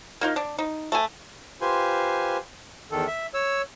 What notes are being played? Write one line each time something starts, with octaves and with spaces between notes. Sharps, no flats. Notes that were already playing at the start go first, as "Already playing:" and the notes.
A#3 D#4 F4
D4
D#4
A3 G#5
F4 G4 B4 C5 G#5 C6
E2 D#3 A4
E5
C#5 E6